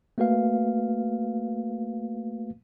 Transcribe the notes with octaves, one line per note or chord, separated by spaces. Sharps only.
A3 A#3 F#4 B4 F5